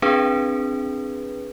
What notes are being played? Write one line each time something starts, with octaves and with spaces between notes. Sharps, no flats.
C4 D4 G#4 B4